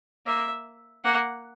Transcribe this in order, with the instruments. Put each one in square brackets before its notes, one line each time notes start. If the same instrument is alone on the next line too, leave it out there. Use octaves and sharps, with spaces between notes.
[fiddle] A#3 [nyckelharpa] E5
[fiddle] A#3 [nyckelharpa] F#5